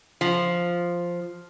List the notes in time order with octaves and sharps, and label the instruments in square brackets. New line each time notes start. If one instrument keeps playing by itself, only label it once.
[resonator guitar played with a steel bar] F3